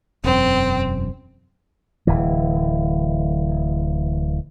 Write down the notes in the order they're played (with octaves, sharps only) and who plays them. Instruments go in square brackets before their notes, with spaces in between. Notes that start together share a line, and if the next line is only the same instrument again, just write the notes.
[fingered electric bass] E1 F#2 [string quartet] C4
[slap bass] D1 E3